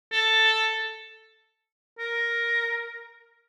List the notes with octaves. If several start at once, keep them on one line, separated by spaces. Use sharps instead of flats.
A4
A#4